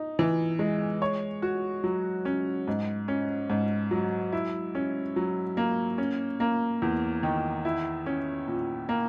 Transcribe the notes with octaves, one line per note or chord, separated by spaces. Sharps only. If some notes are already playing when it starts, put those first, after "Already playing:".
Already playing: D#4
E3
G#3
C#5
F#4
F#3
C#4
G#2
C#4
G#2
F#3
E4
C#4
F#3
A#3
C#4
A#3
E2
D#3
E4
C#4
A#2
A#3